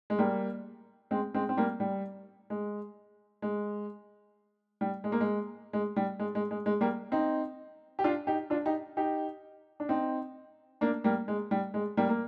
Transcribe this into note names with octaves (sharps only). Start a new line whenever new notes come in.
G#3
G3 A#3
G#3 C4
G#3 C4
C4
G3 A#3
G3
G#3
G#3
G3
G#3
A#3
G#3
G#3
G3
G#3
G#3
G#3
G#3
G3 A#3
C4 D#4
G4
D4 F4
D#4 G4
D4 F4
D#4 G4
D#4 G4
D4
C4 D#4
A#3 D4
G3 A#3
G#3
G3
G#3
G3 A#3
A#3